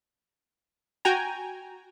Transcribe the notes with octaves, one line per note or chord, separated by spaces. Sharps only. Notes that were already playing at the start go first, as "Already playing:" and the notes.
F#4 G5 G#5 A#5